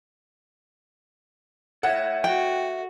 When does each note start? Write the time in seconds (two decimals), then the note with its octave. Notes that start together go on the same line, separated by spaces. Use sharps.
1.83 A4 C#5 E5 F#5
2.24 F#4 G5